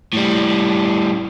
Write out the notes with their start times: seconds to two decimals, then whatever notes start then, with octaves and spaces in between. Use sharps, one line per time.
0.13 A2 G3